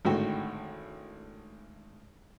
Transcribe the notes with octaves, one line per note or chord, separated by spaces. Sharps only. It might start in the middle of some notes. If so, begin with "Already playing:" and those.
G#1 A2 D3 F#4 G5